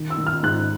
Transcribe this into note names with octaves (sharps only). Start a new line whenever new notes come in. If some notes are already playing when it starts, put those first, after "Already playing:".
Already playing: D#3
E6
D#3
F6
G#2 F#6